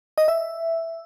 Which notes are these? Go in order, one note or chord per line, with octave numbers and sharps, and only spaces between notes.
D#5
E5